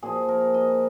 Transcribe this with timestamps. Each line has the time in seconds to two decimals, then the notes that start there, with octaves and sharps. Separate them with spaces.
0.02 A#2 F3 G#4
0.29 A#4
0.54 D#5